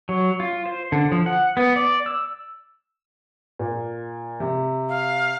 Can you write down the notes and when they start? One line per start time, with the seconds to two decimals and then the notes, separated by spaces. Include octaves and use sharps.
0.09 F#3
0.40 F4
0.66 C5
0.92 D3
1.12 F3
1.26 F#5
1.57 B3
1.76 D5
2.06 E6
3.59 A#2
4.40 C3
4.89 F5